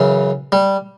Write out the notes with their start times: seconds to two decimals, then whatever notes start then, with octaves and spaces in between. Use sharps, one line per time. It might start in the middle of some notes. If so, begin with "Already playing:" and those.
Already playing: F#2 C#3 E3
0.52 G3